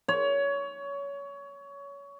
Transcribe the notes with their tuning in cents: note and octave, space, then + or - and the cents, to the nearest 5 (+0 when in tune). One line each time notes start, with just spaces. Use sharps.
C#5 +20